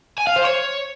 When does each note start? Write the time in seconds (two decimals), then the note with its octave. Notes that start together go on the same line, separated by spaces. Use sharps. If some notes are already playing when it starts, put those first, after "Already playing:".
0.18 G#5
0.27 F5
0.36 C5
0.45 C#5